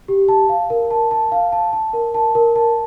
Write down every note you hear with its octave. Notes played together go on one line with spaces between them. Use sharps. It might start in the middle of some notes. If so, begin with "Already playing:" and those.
G4
A5
F5
A#4
A5
A5
F5
A5
A5
A#4
A5
A#4
A5